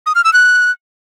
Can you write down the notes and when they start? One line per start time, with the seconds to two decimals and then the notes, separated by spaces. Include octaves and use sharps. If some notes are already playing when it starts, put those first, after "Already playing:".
0.06 D#6
0.15 F6
0.24 E6
0.33 F#6